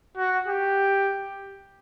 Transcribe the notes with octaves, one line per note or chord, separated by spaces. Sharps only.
F#4
G4